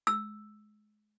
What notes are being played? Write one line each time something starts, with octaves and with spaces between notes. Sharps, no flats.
E6